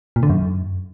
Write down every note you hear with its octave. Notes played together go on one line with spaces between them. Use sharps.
A#2
D3
F#2